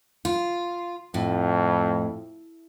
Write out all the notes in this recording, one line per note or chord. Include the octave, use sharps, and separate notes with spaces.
F4
F2 A2